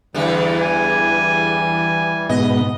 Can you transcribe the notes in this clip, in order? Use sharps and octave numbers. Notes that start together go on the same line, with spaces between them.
E2 D3 E3 G3
G#5
G#2 B2 B3 D#5